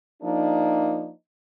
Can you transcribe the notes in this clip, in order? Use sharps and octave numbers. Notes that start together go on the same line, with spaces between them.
F3 A#3 D4 D#4